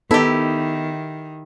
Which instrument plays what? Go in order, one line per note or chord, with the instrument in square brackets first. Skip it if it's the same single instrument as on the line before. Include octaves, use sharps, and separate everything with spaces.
[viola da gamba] D#3 [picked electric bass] B3 [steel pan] D#4 A4 A5 [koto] E4 G4